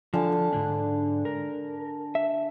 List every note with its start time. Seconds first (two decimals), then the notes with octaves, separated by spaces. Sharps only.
0.14 D3 F3 G#5 A5
0.32 A5
0.53 G#2 D3 D4
1.25 A#4
2.15 E5